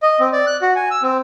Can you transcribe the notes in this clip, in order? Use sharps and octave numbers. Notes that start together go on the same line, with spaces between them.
D#5
C4
D5
F#6
F#4
G#5
E6
C4